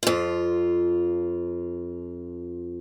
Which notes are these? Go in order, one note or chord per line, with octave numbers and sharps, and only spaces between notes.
F2 F4